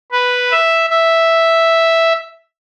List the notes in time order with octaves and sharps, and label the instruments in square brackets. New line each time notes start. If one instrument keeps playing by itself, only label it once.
[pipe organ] B4
E5
E5